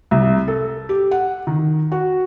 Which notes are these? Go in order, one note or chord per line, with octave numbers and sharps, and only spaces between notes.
C2
A4
G4
F#5
D#3
F#4